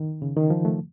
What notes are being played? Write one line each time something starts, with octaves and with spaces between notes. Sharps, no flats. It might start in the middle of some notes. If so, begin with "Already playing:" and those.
Already playing: D#3
C#3
D#3
F3
A3